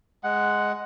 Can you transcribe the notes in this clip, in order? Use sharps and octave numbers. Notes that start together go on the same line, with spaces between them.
G#3 F#5